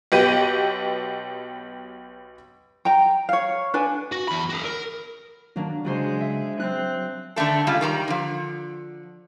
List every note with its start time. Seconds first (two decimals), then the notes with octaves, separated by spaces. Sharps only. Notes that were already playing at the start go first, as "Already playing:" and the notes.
0.12 B1 B3 G4 D#7
2.85 G5 A#5
3.29 C#5 F5
3.74 D4 B4 G#5
4.12 F#4
4.28 E2 B5
4.50 F#4 G#4
4.64 A#4
5.56 D#3 F#3 A#3 D4
5.85 C#3 F#3 G#3 F#4 C5
6.20 E5
6.60 F#3 C4 F#6
7.36 D3 D#3 A3 A4
7.67 C#3 G3 G#3 F4
7.81 D#3 G3 G4 A#5
8.08 D3 F3